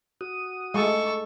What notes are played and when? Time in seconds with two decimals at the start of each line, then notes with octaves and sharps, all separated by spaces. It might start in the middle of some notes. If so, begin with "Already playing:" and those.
0.21 F#4 D#6
0.74 G#3 A3 A4 C#6